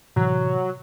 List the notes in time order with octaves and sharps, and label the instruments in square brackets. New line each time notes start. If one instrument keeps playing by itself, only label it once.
[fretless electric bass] A2 C3 E3 [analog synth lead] F#3